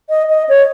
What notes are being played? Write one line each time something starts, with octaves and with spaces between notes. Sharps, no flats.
D#5
D#5
C#5